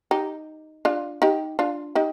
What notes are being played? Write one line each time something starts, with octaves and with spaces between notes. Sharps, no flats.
D#4 G4
D4 F4
D#4 G4
D4 F4
D#4 G4